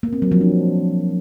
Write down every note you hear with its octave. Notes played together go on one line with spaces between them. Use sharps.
A#3
C4
F#3
F3
D4